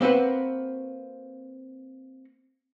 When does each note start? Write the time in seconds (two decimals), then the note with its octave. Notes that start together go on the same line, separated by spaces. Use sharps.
0.01 A#3 C4 F#4 B4 F#5